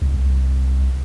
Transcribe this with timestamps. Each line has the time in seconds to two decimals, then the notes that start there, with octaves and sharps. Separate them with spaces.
0.02 C2